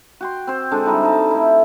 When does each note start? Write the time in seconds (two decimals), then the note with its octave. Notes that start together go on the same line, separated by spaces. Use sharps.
0.21 F#4 G5 C6
0.47 C4 C5
0.71 D3 G#3 C4 D4
0.85 G3 D#4 E4 A4
1.03 D#4 A5
1.31 A3 E4